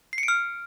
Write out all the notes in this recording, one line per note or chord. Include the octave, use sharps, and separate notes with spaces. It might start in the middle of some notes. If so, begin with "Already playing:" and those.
C7
C#7
D7
F6